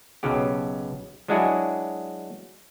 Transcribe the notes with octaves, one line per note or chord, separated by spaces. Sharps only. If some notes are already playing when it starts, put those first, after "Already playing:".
B1 C#3 F#3 G4
F#3 G#3 D4 E4 F#4 G#4